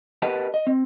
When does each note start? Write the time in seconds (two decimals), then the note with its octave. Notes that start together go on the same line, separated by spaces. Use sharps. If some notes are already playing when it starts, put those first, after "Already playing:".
0.22 G4 A#4 B4 D#5 F#5 A5
0.54 D#5
0.67 C4